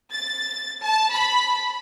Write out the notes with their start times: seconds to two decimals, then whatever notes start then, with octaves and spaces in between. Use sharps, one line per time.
0.11 A6
0.81 A5
1.12 B5